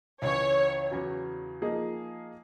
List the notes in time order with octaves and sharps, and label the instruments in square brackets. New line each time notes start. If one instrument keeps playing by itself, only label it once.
[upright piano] C#2 C#3 E3 [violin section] C#5
[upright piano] E2 C#3 F#3
F3 A#3 D#4 G#4